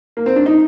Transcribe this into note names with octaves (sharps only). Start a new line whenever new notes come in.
A#3
C4
D4
D#4